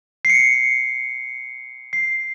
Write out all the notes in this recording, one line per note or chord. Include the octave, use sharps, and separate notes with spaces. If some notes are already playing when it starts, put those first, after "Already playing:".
C7
C#7
C7